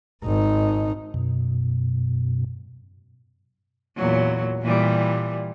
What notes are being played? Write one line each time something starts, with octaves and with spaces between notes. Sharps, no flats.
G#1 D#4
F#2 B2
E2 A#2 F#3
A#2 E3 G3